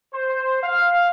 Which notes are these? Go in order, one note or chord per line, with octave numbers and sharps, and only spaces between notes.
C5
F5